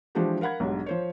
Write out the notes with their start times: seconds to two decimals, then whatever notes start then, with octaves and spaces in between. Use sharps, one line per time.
0.15 E3 F3 G#3 D4 F#4 G4
0.41 A#4 F5 F#5 B5 G#6
0.60 B1 G#2 F#3 G3 D4
0.86 F3 C5 C#5